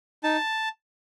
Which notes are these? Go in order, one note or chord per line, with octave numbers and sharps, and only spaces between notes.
D#4 A5